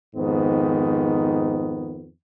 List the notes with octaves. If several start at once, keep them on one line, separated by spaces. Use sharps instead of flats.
F2 G#2 D#3 B3